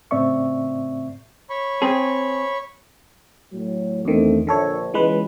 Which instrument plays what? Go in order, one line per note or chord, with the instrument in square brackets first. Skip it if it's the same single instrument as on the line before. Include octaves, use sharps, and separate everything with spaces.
[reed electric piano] A2 C#3 C4 D5 E5 C#6
[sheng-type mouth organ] C#5 B5 C#6
[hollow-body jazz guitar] C4 G#4
[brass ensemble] A2 F#3
[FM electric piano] E2 D#3 [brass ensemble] A3 C4 D4
[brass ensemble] A#1 [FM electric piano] D3 A4 C#5
[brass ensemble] C#2 B2 [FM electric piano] E3 G#3 B4